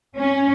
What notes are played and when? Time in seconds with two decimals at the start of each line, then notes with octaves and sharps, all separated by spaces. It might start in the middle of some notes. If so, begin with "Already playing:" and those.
0.17 C#4